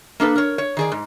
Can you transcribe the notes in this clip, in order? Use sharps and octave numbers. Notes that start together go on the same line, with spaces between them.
A#3 D4 A4 B4
A#4 C#5
C#5
D#3 G#4 D5
G#2